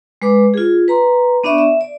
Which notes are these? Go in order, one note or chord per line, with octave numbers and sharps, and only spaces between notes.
G#3 B4 D6
F4 G#4
B4 A#5 C6
B3 D4 D5 E5 C#6
E5
D5